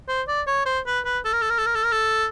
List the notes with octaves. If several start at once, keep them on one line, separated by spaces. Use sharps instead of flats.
C5
D5
C#5
C5
B4
B4
A4
A#4
A4
A#4
A4
A#4
A4
A#4
A4